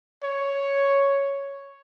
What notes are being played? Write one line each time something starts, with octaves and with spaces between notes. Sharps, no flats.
C#5